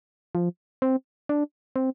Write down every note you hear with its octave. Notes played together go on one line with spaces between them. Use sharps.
F3
C4
D4
C4